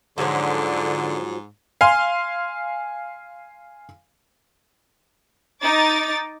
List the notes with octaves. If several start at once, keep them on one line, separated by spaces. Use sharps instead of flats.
G#2 D3 F3 F#3
F5 G#5 C6
D#4 D6 A6